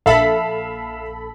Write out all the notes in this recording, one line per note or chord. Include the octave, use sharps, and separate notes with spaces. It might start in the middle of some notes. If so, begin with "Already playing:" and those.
A#1 A4 E5 F5 B5